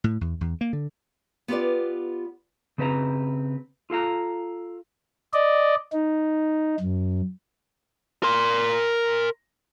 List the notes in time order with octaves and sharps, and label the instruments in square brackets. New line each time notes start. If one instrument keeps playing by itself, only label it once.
[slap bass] A2
E2
E2
A#3
D3
[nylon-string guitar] B3 F4 G4 B4 D5
[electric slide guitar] C#3 C4 B4 D5 A#5
F4 A4 F5 A#5
[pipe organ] D5 D#5
D#4
F#2
[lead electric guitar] A#4 C6